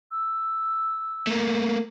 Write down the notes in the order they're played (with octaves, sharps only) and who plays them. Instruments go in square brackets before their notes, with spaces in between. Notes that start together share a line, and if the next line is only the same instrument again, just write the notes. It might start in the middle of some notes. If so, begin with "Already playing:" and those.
[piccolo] E6
[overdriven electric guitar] A3 A#3